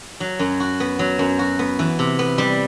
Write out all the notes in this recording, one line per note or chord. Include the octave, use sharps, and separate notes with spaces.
F#3
F#2
F#4
B3
F#3
F#2
F#4
B3
E3
C3
B3
G3